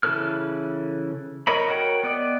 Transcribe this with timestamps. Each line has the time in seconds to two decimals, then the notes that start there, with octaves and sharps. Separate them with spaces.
0.03 C#3 E3 A4 B4 F6
1.47 A#4 C#5 D#5 B5
1.69 F#4 A#4 C#5 G5
2.03 B3 D5 D#5